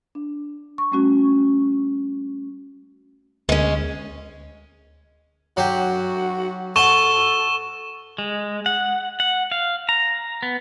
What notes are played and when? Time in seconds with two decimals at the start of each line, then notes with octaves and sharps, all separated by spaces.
0.15 D4
0.78 C#6
0.91 G3 A3 C#4 F#4
3.49 D2 G#3 C#4
5.57 F#3 F#4 G4
6.76 A4 F#5 A5 C#6 E7 G7
8.18 G#3
8.66 F#5
9.20 F#5
9.52 F5
9.89 A#5
10.43 B3